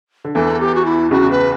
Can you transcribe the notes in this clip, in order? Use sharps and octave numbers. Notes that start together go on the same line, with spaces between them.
D3
E2 E3 A4
G4
F#4
E4
C#2 C#3 F#4
B4